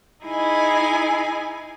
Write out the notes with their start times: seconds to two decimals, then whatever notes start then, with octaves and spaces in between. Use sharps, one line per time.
0.25 D#4 E4 G#4 G#5